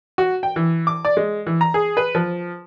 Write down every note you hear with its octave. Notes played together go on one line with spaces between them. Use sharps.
F#4
G5
E3
D6
D5
G#3
E3
A#5
G#4
B4
F3